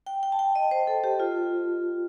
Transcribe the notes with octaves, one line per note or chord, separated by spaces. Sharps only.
G5
G5
A5
G5
D#5
C5
A4
G4
F4